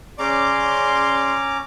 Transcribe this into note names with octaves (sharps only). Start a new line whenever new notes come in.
C#3 C#4 D5 A#5 C6 D6